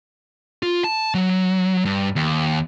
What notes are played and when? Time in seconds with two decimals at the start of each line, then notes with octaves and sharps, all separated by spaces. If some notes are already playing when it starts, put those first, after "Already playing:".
0.63 F4
0.84 A5
1.14 F#3
1.85 G2
2.16 D#2